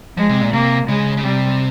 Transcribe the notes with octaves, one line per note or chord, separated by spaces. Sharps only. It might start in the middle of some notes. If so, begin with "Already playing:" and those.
F3 G#3
C3
A#2
C3 A#3
C#3 G#3
C#3
C3 G3